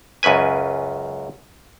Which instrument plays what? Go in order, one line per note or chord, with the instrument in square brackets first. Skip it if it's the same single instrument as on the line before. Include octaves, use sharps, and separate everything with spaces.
[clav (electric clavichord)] C#2 F#2 C#3 B4 G#5